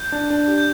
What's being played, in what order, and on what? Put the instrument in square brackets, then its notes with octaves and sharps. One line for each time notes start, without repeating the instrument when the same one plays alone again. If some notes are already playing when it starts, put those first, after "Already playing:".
Already playing: [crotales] G6
[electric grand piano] D4
D4
G4
[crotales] G6